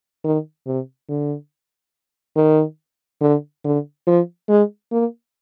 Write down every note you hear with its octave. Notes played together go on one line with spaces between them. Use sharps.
D#3
C3
D3
D#3
D3
D3
F3
G#3
A#3